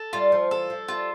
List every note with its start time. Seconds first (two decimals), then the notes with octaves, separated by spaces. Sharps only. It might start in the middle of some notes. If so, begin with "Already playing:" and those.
Already playing: A4
0.13 G3 F4
0.32 F3
0.51 E3 A4
0.70 F3
0.88 G3 F4